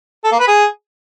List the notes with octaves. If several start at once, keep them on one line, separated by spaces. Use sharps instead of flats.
A4
A#3
B4
G#4